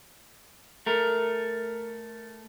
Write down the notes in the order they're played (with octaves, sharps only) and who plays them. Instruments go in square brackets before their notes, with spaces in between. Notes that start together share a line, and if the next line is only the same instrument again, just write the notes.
[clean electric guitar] A3 A#4